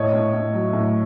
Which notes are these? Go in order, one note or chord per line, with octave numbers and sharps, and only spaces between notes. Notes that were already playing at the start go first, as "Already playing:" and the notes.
Already playing: A2 C#5 D#5
A2
A2
F#3
A2